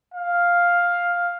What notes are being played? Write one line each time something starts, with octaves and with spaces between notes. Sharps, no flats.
F5